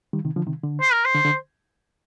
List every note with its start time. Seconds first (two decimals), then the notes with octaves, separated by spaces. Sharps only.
0.13 D#3 G3
0.25 C3 D#3
0.36 D3 F3
0.47 C3 D#3
0.63 D3
0.81 C5
0.93 A#4
1.05 C5
1.14 D3
1.25 D3